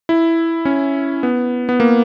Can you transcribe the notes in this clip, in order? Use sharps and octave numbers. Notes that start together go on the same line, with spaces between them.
E4
C#4
B3
B3
A#3